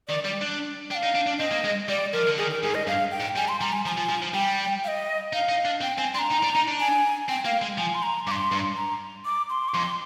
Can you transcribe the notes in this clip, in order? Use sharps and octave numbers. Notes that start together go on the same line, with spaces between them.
D#3 D5
G3 D5
D4
D4 G5
F5
D#4
D4
D4
C4 D#5
A#3
G#3
G3 D5
F3 A#4
D3
D#3 G#4
A#4
G#2 G#4
D#5
G2 F5
G5
G#2
G3 G#5
C6
G3 A#5
G#5
F3 A#5
G#5
F3
F3
F3
G3 G5
F5
D#5
D#4 F5
D#4
D4
C4 G5
C4 G#5
D4 C6
A#5
D#4
D4
D#4
D4
G#5
C4 G5
A#3 F5
G#3
F3 G#5
C6
A#5
G2 D6
C6
G2
A#5
D6
C6
D6
F2 C6